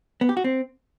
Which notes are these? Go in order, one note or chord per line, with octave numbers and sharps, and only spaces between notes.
B3
G4
F#4
C4